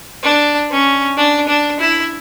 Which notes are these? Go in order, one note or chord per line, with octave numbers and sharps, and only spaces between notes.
D4
C#4
D4
D4
E4